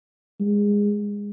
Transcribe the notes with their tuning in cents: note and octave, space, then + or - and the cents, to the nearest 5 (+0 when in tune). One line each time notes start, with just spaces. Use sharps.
G#3 -20